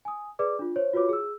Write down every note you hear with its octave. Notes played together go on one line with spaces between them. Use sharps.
G#5 D#6
G#4 B4 D5 D6
D4 F4
C5 C#5
F4 F#4 B4 C#5 D6
G#4 E6